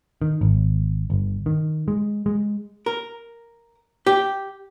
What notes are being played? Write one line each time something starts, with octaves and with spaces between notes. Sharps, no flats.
D#3
G#1
G1
D#3
G#3
G#3
A#4
G4